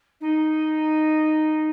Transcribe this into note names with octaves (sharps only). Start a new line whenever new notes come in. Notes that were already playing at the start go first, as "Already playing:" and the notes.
D#4